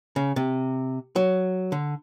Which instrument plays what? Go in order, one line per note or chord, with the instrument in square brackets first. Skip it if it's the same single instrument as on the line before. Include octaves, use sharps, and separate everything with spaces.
[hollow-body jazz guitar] C#3
C3
F#3
D3